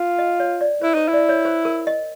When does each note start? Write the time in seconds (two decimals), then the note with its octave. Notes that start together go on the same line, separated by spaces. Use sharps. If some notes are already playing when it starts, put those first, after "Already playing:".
Already playing: F4
0.18 D#5
0.40 C#5
0.61 D5
0.81 E4 C5
0.94 D#4 C5
1.08 E4 D5
1.29 C#5
1.45 C5
1.65 A#4
1.87 D#5